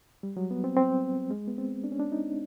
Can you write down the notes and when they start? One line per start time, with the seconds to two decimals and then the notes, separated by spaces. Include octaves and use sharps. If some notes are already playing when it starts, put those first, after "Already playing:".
0.23 G3
0.37 F#3
0.51 B3
0.64 C4
0.77 C4
1.31 G#3
1.48 B3
1.58 C4
1.84 D4
1.92 C#4
2.00 D4
2.12 D#4